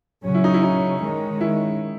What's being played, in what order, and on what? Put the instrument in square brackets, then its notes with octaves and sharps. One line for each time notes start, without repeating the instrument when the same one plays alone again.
[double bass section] C#3 F#3 C#4
[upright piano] E4
D#4
E4
D#4
[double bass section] D#3 G#3 C#4
[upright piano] E4